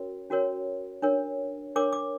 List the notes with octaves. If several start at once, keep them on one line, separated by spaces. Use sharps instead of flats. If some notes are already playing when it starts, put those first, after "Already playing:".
Already playing: C#4 F#4 A#4 C#5
C#4 F#4 A#4 C#5
D4 A#4 C#5
D4 A#4 C#5 D6
D6